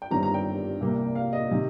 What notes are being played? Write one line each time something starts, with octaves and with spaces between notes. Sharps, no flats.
G5
G1 G2 D#3 G3 C4 A#5
A#5
G5
C2 C3 G3 A#3
F5
D#5
C3 D#3